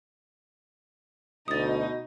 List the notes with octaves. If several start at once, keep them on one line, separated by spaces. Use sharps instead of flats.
D2 B2 D#4 D#6 A6